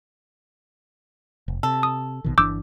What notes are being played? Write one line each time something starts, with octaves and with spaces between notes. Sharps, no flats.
F1
C3 A4
D#6
A#1 B2 D#3
G1 E3 D4 D6 E6 G6